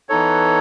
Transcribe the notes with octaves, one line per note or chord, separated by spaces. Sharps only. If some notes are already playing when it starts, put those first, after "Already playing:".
E3 B3 D#4 A4 C#5